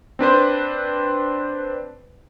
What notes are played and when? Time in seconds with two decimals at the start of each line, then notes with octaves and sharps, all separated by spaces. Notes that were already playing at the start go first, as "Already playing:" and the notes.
0.19 C4 D4 B4 C5